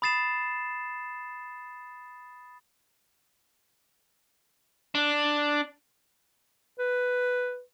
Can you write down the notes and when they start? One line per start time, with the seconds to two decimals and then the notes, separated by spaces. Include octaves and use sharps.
0.02 B5 D#6 A6 C7 E7
4.95 D4
6.79 B4